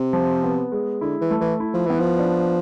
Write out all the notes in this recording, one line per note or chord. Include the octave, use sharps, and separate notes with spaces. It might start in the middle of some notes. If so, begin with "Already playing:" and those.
Already playing: C3
F3
B3
G#3
D3 E4
E3
A3
E3
E4
F3
E3 B3
F3
D4